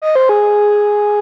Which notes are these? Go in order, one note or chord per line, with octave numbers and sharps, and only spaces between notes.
D#5
C5
G#4